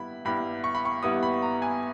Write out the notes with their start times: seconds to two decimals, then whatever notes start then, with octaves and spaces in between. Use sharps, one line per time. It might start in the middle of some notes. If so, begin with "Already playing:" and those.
Already playing: G2 G3 B3 E4 E5 B5
0.25 G2 G3 B3 E4 B5
0.64 C#6
0.75 B5
0.85 C#6
1.03 G2 G3 B3 E4 D#6
1.23 B5
1.42 A#5
1.62 G#5